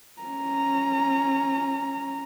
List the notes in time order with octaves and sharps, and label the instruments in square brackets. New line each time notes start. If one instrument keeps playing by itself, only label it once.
[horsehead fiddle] C#4 A#5